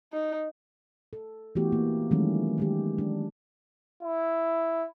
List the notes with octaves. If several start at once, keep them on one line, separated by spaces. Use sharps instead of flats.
D#4
A4
E3 A3 B3 F#4 G4
A#3
D#3 E3 F#3 G#3 A3 C#4
D#3 G#3 G4
G#3 D4
E4